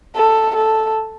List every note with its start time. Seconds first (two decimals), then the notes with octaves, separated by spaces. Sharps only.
0.16 A4
0.55 A4